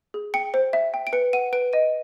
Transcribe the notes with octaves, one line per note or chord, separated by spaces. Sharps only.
G#4
G5 C#7
C5
E5
G5
D7
B4 C#7
F#5 D#7
B4 D7
D#5 D#7